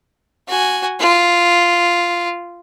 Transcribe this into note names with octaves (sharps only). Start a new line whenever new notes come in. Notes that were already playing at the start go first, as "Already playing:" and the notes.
F#4 G#5
F4